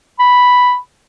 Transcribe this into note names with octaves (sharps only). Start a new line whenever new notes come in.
B5